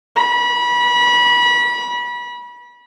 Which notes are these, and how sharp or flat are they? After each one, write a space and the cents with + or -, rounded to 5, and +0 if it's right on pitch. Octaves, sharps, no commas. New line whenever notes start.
B5 -30